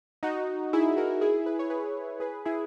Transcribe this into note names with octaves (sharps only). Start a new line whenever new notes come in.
D#4 F#4
E4 G#4
F#4 A#4
E4 G#4
B4
C#5
G#4 B4
G#4 B4
E4 G#4